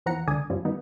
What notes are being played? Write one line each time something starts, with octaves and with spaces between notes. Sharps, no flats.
E2 F3 F#5 A#5 C#7
C#2 D3 D5 G#5 D#6
F#2 F3 G3
D#3 G3 B3 D#4